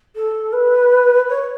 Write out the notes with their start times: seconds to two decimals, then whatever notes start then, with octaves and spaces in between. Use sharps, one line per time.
0.16 A4
0.53 B4
1.29 C#5